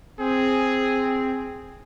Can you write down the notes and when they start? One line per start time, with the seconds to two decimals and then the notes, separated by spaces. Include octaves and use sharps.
0.19 C4 G#4